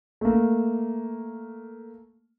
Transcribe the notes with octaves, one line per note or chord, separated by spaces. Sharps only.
A3 A#3